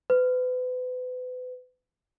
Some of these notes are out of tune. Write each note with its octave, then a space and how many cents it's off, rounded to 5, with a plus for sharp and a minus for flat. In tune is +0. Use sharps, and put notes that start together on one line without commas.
B4 +35